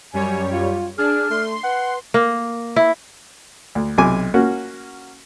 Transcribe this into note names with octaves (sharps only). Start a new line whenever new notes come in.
F#2 G3 G4 C#5 G#5
F4
D4 G#4 F6
A3 C6
B4 F#5
A#3
E4
D2
B1 C3 G#5 D6
A#3 C#4 F#4